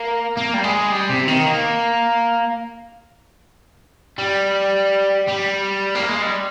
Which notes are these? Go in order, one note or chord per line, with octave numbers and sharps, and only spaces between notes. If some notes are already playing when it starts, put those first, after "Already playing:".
Already playing: A#3
A#3
G3
G#3
G3
C3
D#3
A#3
G3
G3
A#3
G#3
G3